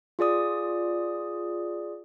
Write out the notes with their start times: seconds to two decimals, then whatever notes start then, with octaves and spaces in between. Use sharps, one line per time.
0.19 F4 G#4 D5 D#6